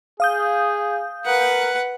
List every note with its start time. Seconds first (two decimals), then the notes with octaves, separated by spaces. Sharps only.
0.20 G#4 F5 D#6 G6
1.26 A#4 B4 F#5